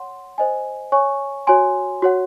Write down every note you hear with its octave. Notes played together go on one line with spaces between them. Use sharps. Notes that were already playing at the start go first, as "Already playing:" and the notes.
Already playing: C#5 F#5 C6
C5 D#5 G#5
C#5 G#5 C#6
F#4 C#5 G#5 C6
F#4 C#5 F#5